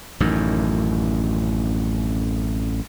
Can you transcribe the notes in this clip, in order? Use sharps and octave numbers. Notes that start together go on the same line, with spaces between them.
A1 F#2 D#3